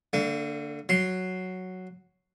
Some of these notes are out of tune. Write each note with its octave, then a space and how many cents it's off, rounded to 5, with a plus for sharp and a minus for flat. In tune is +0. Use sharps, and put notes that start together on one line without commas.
D3 +0 A#3 -45
F#3 +0 C6 +0